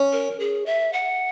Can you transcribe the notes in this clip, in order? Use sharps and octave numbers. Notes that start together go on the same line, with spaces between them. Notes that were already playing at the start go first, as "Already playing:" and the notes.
Already playing: C#4
A#4
G#4
E5
F#5